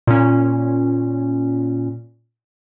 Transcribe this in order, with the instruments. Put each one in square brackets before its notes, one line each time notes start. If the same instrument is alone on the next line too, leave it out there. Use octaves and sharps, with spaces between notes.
[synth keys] A#2 C#4